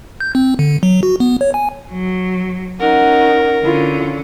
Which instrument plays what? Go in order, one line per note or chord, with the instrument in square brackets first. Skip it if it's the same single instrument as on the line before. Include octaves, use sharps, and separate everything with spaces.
[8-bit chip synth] G6
C4
D3
F#3
F#4
B3
C#5
G#5
[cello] F#3
[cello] C#4 [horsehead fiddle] D#4 F#5 [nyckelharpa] A#4
[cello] D3 C#4 [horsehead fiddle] E4 F4